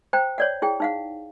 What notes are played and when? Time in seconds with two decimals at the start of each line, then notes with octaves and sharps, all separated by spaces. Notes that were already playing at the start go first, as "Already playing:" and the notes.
0.13 C5 G5 A#5
0.38 C#5 D5 F#5
0.62 E4 G#4 G5
0.80 D#4 F5 F#5